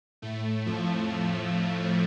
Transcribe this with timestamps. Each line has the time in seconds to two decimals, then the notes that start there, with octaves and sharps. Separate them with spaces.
0.22 A2 A3
0.66 F2 F3